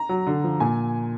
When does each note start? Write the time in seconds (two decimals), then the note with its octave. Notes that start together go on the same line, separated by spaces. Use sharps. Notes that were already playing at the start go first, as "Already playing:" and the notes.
Already playing: A#5
0.09 F#3
0.27 D3
0.44 F3
0.60 A#2 G#5